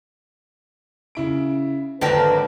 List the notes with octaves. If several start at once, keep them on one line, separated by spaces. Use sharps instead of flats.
C#3 E4 D7
G#1 D3 F#3 A#4 B4 G5 A5